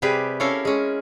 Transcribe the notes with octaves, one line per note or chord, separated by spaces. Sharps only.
C3 G3 G4 G#4 B4
C#4 E4 A4 A#4 F5
G#3 C#4